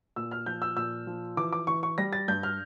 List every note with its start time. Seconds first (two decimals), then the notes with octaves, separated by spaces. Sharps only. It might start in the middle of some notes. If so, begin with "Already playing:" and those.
0.16 A#2 E6
0.31 F6
0.46 F3 G6
0.62 E6
0.77 A#2 E6
1.07 F3
1.37 E3 D6
1.53 D6
1.67 E3 C#6
1.83 C#6
1.98 G3 A#6
2.13 A6
2.28 G2 G6
2.43 F6